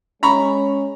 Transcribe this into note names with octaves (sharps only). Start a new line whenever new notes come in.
G#3 C#4 A#5 B5 C#6